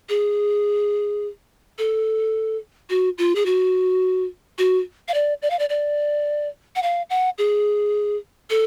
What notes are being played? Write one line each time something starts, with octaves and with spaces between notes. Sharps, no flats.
G#4
A4
F#4
F4
G#4
F#4
F#4
F5
D5
D5
F5
D5
D5
F#5
F5
F#5
G#4
A4